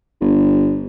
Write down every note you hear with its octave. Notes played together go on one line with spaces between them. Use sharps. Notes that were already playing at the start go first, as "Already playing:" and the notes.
G1